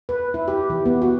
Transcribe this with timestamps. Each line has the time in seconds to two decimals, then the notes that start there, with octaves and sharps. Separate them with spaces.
0.09 B4
0.34 E4
0.48 G4
0.70 E3
0.86 B3
1.02 F#4